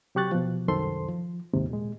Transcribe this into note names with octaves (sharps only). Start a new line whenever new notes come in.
C3 F#3 G4 C#6 F#6 A6
B2 F3
C2 F#2 D#3 A4 C5 C6
F3
D#2 G#2 C3
A#2 G#3